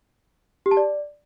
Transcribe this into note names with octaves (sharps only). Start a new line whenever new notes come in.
G4
A5
D5